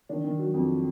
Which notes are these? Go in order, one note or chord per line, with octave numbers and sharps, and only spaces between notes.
D#3 D4
D#3
F#3
F2